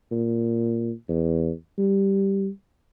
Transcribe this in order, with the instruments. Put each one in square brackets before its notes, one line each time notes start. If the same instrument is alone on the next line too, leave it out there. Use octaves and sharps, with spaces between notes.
[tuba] A#2
E2
G3